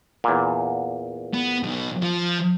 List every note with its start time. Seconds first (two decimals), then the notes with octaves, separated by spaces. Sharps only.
0.24 E2 A#2
1.33 B3
1.63 B1 B2
2.02 F3